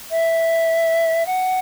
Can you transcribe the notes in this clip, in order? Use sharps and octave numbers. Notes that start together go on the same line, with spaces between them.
E5
F#5